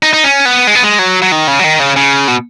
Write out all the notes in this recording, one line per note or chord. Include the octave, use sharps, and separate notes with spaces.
D#4
D#4
C#4
B3
G#3
B3
G#3
F#3
F#3
D#3
C#3
F#3
D#3
C#3
C#3
B2